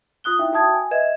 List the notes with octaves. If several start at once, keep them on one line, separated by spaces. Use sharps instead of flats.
F4 D#6 F#6 G7
D#4 E4 E5 G5
F#4 E5 G5 A5 D#6 G#6
G#5
B4 D#5 E5 G#6 E7